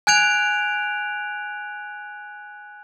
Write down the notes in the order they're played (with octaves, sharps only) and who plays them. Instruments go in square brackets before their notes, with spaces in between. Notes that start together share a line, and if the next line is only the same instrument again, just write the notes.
[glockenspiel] G#5 F#6 G#6 D7 F7